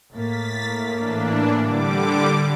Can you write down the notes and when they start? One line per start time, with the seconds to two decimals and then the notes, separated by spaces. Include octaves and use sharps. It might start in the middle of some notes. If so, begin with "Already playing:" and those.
0.12 A2 A#3 A6 B6
0.97 E3 D4
1.60 D3 G3 D6